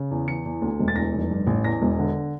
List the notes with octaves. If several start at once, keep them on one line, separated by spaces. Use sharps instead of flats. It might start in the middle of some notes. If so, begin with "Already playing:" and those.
Already playing: C#3
E2
E3 C#7
E2
D2
E1
A6
E2 A#6
F1
G2
A1
E2 A#6
E1
D3